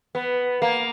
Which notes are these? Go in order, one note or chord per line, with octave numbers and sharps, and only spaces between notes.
B3
A#3